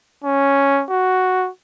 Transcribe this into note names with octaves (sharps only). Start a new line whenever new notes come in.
C#4
F#4